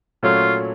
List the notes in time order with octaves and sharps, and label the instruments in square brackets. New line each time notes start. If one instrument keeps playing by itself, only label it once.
[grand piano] A#2 F#3 A3 C#4 [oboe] F4